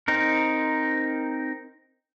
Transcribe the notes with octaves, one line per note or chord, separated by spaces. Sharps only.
C4 D#4 A#4